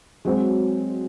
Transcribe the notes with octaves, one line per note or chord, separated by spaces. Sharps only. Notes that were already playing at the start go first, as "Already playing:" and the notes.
F#3 G#3 C4 F#4